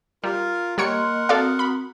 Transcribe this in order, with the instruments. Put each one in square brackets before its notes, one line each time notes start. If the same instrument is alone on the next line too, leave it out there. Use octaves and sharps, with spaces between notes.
[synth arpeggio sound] G3 [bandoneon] F4 A#4
[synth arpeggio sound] G3 C#5 C#7 [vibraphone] A#3 D#5 C6 [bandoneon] A#4 F#5
[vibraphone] C4 F#4 D#6 [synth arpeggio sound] A4 D5 F5
[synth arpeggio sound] B5